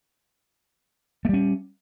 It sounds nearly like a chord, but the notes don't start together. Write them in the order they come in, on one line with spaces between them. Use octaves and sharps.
A3 G3 C#4